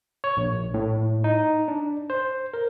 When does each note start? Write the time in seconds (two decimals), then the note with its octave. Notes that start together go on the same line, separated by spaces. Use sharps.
0.24 C#5
0.37 A#1
0.74 A2
1.24 D#4
1.68 D4
2.10 C5
2.54 A#4